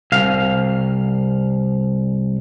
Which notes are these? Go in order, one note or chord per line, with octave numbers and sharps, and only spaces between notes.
C2 F5